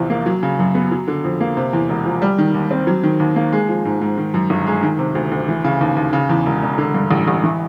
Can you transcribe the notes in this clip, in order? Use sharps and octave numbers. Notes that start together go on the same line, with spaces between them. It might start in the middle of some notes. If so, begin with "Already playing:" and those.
Already playing: A#1 E2 C3 F3
A#3
F#3
C#3
F#2
B3
F#3
D3
F2
A#3
C3
E2
E1
F3
G3
D#3
D#2
C4
F#3
D#3
D#2
A#3
G#3
F3
G#2
G#2
D#3
F#2
G1
G#3
D#3
C3
D2
D2
E3
C#3
D#2
D#2
C#3
E2
E1
E1
D3
G2
A1
A1
E3